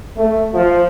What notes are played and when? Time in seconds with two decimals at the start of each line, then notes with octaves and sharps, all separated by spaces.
0.17 A3
0.54 F3